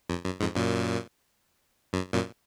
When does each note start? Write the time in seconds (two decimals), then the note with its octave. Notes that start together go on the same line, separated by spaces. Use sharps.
0.10 F2
0.25 F#2
0.40 F2 G#2
0.55 F#2 A#2
1.93 F#2
2.13 F#2 A#2